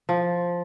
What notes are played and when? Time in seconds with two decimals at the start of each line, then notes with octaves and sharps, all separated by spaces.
0.09 F3